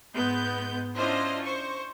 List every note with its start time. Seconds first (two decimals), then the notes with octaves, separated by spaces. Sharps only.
0.15 G#2 G#3 B3 G6
0.96 C#4 D4 E4 F4 C5 D#5
1.43 C5 C#6